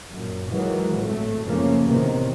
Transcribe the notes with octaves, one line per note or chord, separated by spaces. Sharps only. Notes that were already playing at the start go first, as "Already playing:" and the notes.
F#2 A#2
D#3 E3 F#3 G#3
G#1 A2 A3
F#1 C#3 F3 A3 A#3 C#4
E2 A2 C3 D#3